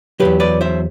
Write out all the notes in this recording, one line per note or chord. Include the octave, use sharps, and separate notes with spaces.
C3 F#3 G4 B4
E2
B4 D5
C5 E5